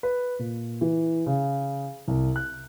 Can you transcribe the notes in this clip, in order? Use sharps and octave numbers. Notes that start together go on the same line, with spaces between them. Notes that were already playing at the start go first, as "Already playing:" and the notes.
B4
A#2
E3
C#3
C2
F#6